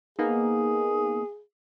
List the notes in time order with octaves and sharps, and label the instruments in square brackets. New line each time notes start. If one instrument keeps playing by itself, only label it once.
[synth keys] A#3 B3 D#4 [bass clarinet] G#4